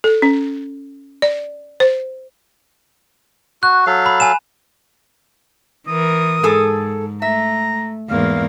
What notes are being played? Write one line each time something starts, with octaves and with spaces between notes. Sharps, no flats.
A4
C#4
D5
C5
F#4 F#6
F#3 A4 F5
B5
G#5 E7
E3 A#4 D#6
G#2 G#4 A4
A3 E5 A#5
E2 G#2 A#3 F5